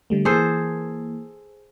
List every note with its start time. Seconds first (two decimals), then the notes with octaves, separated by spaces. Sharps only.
0.10 D3 G3 A3
0.25 E3 A#3 G#4 A4 C5